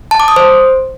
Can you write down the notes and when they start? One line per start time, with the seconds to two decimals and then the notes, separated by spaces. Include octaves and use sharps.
0.11 A5
0.20 D6
0.28 D#6
0.36 C5